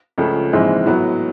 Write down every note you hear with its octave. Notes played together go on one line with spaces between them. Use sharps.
C#2 C#3 F3 A3
A#1 G#2 E3 G#3 C4
A2 F#3 B3